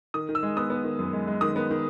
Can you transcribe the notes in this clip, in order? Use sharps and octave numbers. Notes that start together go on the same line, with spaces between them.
D#3 D#6
D#3
E6
G#3
B3 D#6
B3
D#3
F#2
G#3
G#3
D#3 D#6
B3
D#3